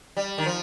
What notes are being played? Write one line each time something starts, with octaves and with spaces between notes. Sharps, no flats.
G3
D#3
F3